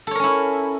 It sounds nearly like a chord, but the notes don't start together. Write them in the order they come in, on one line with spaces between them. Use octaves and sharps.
A4 C#5 A#4 C#4 E4